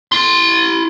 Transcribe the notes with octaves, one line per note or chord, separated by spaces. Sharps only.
E4 C6